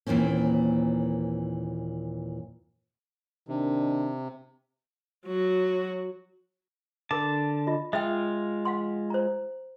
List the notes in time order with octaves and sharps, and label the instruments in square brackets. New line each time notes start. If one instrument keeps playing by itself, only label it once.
[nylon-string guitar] D#2 A#2 E3 A#3 C4 C#4
[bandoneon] C3 [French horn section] D#3 D4
[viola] F#3 F#4
[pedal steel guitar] D3 A5 [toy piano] A#4 D6
[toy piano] F4 D#5
[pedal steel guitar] G#3 F4 [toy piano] E5 G5
[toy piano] F5 F#5 C6
C5 A#5